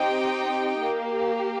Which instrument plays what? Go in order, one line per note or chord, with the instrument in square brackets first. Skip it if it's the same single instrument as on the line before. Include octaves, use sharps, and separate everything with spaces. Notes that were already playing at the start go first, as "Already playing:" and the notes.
Already playing: [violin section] C4 D#4 G4 D#5 G5
A#3 G4